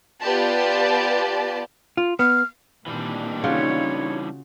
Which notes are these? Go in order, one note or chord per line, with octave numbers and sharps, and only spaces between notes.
B3 F4 G4 D5 A5
F4
B3 F6
A#2 D#3 E3 G3 C4 D4
C#3 D#4 F4 F#4 C#5